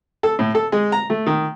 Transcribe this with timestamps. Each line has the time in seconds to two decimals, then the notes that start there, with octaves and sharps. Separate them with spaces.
0.23 A4
0.39 A2
0.55 A4
0.72 G#3
0.92 A#5
1.10 A3
1.26 D#3